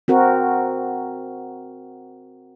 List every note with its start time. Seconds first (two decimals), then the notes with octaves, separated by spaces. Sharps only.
0.08 C4 F#4 A#4